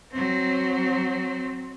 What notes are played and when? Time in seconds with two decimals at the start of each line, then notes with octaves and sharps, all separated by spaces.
0.12 F#3 C4